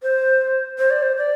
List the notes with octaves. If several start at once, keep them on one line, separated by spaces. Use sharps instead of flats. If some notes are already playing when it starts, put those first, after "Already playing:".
C5
C5
D5
C5
D5